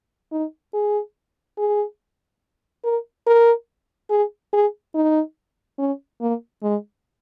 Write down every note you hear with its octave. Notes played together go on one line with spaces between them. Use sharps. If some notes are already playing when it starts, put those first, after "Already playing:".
D#4
G#4
G#4
A#4
A#4
G#4
G#4
D#4
C#4
A#3
G#3